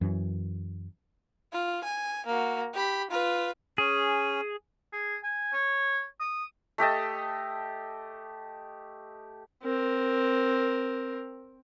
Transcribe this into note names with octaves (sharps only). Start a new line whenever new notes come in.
F#2 E3
F4
G#5
A#3 F#4
G4 B5
F4 B4
C#4 G#4
G#4
G#5
C#5
D#6
A3 G4 D#5 A5
C4 A#4